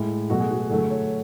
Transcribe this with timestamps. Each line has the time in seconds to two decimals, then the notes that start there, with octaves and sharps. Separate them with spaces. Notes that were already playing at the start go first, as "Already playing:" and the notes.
Already playing: A2 G#3 E4
0.30 B2 F#3 A3 F#4
0.40 G#4
0.51 F#4
0.70 D3 F#3 A3 G#4
0.90 C#5